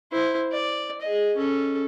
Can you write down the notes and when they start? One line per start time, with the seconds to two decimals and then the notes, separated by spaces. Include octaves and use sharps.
0.12 E4 C5
0.52 D5
1.01 G#4 D#5
1.37 C#4 A4